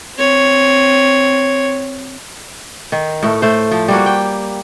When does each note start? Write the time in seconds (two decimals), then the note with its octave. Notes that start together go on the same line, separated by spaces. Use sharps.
0.17 C4 C#5
2.92 D#3
3.23 A2 A3
3.42 A3 C5
3.72 F3
3.88 G3 A#3 F#4
4.06 G5